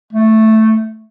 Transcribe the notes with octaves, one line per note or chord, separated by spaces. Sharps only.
A3